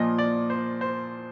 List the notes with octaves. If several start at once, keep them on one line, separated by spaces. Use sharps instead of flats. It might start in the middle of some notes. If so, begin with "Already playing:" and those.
Already playing: A#2 F3 A#3 D#5
D5
C5
C5